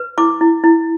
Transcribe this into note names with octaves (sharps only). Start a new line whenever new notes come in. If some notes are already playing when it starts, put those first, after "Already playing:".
Already playing: B4
E4 D6
E4
E4